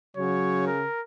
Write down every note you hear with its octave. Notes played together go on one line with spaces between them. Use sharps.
C#3 F#3 C#5
A#4